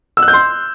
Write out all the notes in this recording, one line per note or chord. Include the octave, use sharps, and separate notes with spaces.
E6
F#6
G6
C6